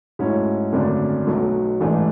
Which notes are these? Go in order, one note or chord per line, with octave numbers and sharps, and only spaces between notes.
G#2 F#3 A3 C#4 E4
G#1 F#2 D3 A3 D4
B1 B2 F#3 A3
A1 G#2 E3 A3 D4